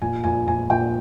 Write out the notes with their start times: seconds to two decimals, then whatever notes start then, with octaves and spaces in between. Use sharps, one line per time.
0.02 A#2 G#5
0.24 A#2 G#5
0.48 A#2 G#5
0.70 A#2 G5